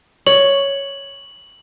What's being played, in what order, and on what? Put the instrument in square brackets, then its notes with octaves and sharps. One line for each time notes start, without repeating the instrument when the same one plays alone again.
[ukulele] C#5 [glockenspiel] F#7